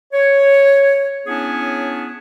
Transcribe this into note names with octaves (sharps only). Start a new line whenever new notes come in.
C#5
B3 C#4 D4 E4 G#4 C#5